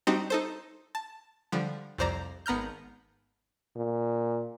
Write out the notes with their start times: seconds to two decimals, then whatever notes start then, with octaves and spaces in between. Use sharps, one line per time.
0.07 G3 C4 D4 D#4 F#4 G4
0.30 D#4 A4 C5
0.95 A5
1.52 D3 F3 G3
1.98 C2 F2 C5 D5 A#5 A#6
2.46 G#1 B3 A#5 F6 G6
3.76 A#2